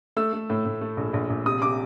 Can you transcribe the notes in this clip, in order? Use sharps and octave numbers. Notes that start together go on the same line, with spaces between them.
A3 E6
A3
A2
A2
A3
A#1
A#1
A#1
C3 D#6
C3 D6